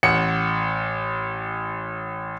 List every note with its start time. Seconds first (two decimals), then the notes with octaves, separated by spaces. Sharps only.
0.03 A1 F#5 C#7